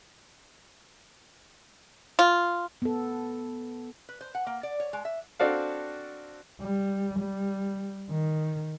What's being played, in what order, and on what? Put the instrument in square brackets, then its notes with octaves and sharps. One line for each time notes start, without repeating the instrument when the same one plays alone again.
[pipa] F4
[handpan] B3 A4
[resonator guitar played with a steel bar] B4
C5
F#5
A#3
D5
C#5
G#3
E5
[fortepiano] C4 D4 F#4 A4 F5
[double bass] G3
G3
D#3